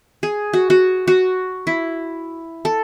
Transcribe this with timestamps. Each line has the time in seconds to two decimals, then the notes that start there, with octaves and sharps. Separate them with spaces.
0.23 G#4
0.53 F#4
0.70 F#4
1.08 F#4
1.67 E4
2.65 A4